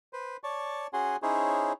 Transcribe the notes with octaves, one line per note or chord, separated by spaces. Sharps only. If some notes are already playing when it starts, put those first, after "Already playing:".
B4 C5
C#5 D5 A5 C#6
C#4 F#4 G#4 F#5 G#5 C6
C#4 D#4 E4 G#4 C5 C#5